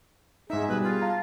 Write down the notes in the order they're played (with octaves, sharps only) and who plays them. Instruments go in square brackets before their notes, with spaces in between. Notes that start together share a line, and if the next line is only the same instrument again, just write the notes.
[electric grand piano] G#2 D#4 [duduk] G#4 [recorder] E5
[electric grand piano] B2 G3 [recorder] B4
[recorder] F4
[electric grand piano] F5 A5 A#5